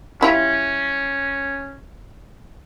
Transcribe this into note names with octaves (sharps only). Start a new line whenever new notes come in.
G3 C#4 E4 F4